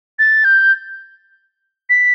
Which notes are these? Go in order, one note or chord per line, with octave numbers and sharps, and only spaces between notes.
A6
G6
B6